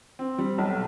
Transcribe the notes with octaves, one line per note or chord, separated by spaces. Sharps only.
C4
G3
B1